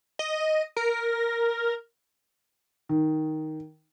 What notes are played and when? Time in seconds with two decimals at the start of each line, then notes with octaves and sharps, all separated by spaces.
0.19 D#5
0.77 A#4
2.89 D#3